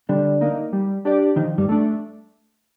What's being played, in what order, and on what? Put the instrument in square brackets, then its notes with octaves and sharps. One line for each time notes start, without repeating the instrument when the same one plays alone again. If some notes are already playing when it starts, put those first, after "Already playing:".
[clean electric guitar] D3 D4 [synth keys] G3
[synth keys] A#3 D#4
G3
D4 G4 D5
[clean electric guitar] D#3 D#4 [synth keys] F3
[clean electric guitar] G2 G3
[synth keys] A3 D4